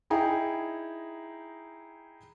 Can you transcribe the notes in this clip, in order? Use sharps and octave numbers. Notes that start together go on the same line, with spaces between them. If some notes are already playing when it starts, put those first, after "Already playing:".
D#4 E4 G#4 G5 A#5